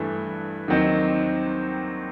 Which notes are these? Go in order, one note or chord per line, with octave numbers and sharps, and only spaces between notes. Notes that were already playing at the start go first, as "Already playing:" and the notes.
Already playing: G2 E3 A3
D#2 D#3 F#3 C4 D#4